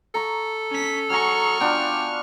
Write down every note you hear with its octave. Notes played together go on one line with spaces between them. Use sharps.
A4 A#5 C#6
C#4 B6
F#3 G#4 A#5 C#6 F6
B3 D4 F4 G5